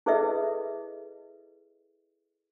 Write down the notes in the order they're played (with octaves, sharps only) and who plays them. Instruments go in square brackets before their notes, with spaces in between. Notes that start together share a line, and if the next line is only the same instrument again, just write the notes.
[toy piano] E4 G#4 A4 B4 D#5 E5